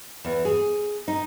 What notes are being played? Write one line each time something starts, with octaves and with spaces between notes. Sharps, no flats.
E2
G#4
D#4